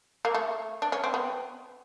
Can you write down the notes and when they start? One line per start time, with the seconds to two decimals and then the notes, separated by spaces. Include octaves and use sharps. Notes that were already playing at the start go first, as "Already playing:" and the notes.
0.25 A#3
0.35 A3
0.82 D4
0.92 C#4
1.04 C4
1.14 B3